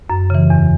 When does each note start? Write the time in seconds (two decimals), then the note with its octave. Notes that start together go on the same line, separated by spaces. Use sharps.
0.10 F#2
0.30 C#3 E3
0.50 E2